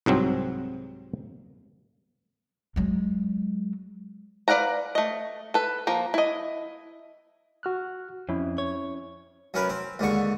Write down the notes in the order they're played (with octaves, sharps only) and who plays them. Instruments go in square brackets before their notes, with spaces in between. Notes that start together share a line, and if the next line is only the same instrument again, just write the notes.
[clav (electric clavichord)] C2 G#2 F#3 C4
[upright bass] F#3 G#3
[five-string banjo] B4 D5 F5 F#5 A#5
A3 D#5
A4 B4
F3 A#3 A#5
E4 D#5
[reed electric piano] F#4 F6 F#6
[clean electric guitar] F2 [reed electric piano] C#4 E4
[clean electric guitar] C#5
[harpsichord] F#2 C#4 A#4 B4
C4
D#2 G#2 D3 C#6